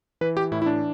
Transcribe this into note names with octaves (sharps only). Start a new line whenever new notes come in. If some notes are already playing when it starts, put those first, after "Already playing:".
E3 B4
G4
A2 E4
E4
D4